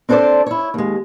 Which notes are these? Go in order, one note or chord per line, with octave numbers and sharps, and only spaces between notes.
C4 D4 A4 A#4 C5 D5
E4 C#5
D#2 G#3